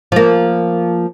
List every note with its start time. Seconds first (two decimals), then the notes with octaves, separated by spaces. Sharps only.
0.12 F3 A#3